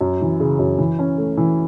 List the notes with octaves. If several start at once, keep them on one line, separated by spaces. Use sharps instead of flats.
F#2
E3
C#3
F#2
E3
C#4
A3
E3